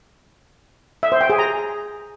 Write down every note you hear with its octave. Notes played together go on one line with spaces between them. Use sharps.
E5
C5
G5
G#4
A#5